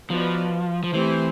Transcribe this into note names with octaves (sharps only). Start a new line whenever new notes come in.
F3 B3 D#4 F#4 B4 D5
F3
E3 A3 C4 E4 G4 C5